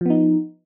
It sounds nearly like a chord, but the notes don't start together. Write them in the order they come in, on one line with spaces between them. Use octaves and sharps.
F3 B3 D#4